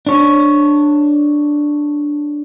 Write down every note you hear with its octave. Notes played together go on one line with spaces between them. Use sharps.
D4 C#5